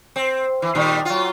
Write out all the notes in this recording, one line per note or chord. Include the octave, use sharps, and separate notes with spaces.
C4
E3
A#2 D#3 G3
F#3 F4